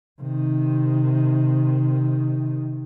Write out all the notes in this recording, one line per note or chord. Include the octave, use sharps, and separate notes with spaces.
C3 D#3